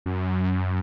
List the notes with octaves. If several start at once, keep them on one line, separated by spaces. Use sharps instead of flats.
F#2